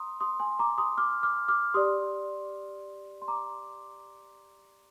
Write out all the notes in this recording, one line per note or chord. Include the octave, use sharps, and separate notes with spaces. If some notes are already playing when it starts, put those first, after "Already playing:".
Already playing: A#5 C6 D#6
C6 D#6
G#5 C6
A#5 D6
C6 D#6
D6 F6
D6 F6
D6 F6
G4 D5 C6 D#6
C6
A#5 D6